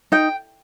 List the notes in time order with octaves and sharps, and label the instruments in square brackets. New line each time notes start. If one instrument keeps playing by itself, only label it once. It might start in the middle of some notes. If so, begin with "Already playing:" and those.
[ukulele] D#4 [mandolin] G5